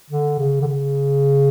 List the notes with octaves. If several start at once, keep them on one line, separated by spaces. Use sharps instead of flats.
D3
C#3
D3
C#3